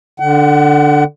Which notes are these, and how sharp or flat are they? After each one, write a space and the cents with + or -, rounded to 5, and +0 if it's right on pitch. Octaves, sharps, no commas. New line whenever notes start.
D3 +0 F#5 +40